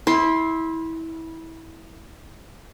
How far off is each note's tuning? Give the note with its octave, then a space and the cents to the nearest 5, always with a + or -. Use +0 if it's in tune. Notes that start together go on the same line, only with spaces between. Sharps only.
E4 -20 C6 +10